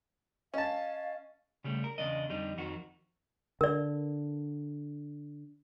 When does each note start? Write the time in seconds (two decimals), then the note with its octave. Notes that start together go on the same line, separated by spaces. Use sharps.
0.54 C#4 D#5 F5 A5
1.64 C#3 G3 A3
1.84 A#4
1.98 E2 C#3 D4 D#5
2.29 F2 D3 G3 D#4
2.57 F2 D#3 F#4
3.61 D3 A#4 D5